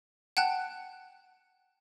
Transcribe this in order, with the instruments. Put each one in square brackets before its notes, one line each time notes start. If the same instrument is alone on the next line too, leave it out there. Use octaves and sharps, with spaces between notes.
[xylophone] F#5 G5 A5 F#6